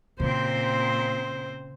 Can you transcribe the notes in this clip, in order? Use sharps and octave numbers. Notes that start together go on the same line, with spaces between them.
A#2 C#3 C4 C5